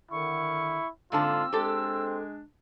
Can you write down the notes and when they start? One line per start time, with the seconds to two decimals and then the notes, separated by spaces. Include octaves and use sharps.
0.11 D3 D#3 E4 C#6
1.12 G#2 D3 F3 A#3 C4 F4 A5 E6
1.53 G#3 C4 D4 G4 A4